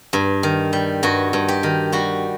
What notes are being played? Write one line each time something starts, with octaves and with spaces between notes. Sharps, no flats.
G2
D#3
G3
G2 F#4
G2
G4
D#3
G3 F#4